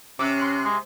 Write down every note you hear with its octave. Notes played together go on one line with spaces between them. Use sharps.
C3 C#4 D6 E6 F#6
C6 F#6 C7
G#3